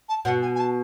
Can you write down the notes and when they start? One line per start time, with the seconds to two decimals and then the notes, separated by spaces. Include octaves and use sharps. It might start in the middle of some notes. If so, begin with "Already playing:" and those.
0.09 A5
0.25 B2 F#5
0.42 G#5
0.55 G#5
0.60 A5